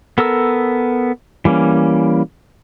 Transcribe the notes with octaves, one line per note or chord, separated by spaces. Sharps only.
B3 A4 A#4 E6
E3 G3 A#3 C#4